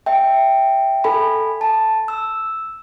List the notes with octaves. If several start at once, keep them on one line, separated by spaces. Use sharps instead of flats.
E5 G5
A4 G#5 B5
A5
E6